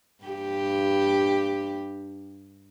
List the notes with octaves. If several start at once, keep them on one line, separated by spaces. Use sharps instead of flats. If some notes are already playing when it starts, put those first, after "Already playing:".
G2 G4